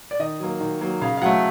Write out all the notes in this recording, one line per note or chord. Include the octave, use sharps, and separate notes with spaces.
D5
D#3 D#5
F#3 A#3
D#3
F#3 A#3
C#3 F5
F5
F#3 A3 F#5